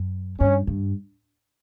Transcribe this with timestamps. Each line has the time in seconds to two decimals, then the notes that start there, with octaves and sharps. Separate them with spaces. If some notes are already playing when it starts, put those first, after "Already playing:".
Already playing: F#2
0.40 G2 C#4
0.67 G2